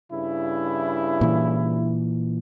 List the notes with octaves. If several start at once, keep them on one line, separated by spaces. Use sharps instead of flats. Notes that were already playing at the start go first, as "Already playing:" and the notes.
G2 C#3 E4
A#2 E3